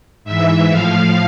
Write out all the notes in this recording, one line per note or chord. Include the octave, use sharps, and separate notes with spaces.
G#2 E3 E5
A2 F3 F5